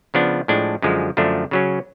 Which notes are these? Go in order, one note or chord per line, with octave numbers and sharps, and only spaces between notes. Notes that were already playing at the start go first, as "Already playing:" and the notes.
C#3 F3 B3 D4
A2 F3 G#3 D4
F#2 D3 F3 G#3
F#2 D3 F3 A3 D4
C#3 F#3 C#4